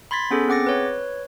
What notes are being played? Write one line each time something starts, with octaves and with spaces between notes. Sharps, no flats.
B5 C6 G#6 A6 B6
B3 C#4 G#4 A4
C4 G#4 F#5 D6 A6 A#6
B4 C#5